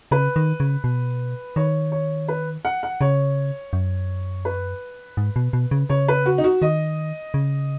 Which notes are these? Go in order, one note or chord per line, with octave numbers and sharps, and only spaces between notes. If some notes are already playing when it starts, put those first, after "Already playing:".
C#3 B4
D#3
C#3
B2
D#3 C#5
C#5
B4
F#5
F#5
C#3 C#5
F#2
B4
G#2
B2
B2
C#3
C#3 C#5
B4
F#4
D#4
F#4
D#3 D#5
C#3